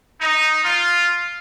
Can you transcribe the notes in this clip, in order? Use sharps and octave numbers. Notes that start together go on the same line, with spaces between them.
D#4
F4